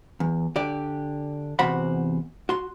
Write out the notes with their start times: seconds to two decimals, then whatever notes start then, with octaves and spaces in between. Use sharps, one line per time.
0.20 E2
0.56 D3 G4 D5
1.59 E2 C3 F#4 C5 F#5 B5
2.49 F#4 C6